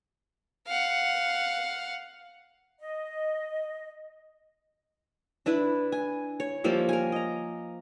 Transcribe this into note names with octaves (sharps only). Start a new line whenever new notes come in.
F5 F#5
D#5
D4 E4 B4
G#5
C#5
F3 G3 A#3 E5
A#4 G#5
D#5 A#5